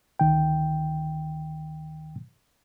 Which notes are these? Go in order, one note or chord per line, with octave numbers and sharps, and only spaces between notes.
D2 D#3 G5